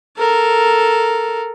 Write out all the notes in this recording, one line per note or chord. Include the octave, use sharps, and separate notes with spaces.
A4 A#4